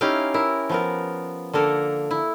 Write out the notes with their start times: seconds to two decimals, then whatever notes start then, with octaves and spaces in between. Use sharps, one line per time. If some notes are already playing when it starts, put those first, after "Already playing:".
0.01 C#4 D#4 E4 G4 F5
0.34 E4 A#4
0.69 F3 B3 A#4
1.53 D3 A#3 A4 A#4
2.11 E4